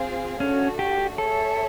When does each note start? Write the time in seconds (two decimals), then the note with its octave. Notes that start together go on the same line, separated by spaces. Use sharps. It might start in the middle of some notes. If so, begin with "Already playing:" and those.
Already playing: C4 F4 G#4 C5 F5
0.40 A3 C#4 D4 F#4
0.79 G4
1.18 G#4 A4 C#5 E5 A5